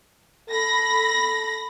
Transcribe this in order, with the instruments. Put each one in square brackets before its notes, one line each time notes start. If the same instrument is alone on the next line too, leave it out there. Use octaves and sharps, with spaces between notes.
[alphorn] A4 [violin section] B5 A#6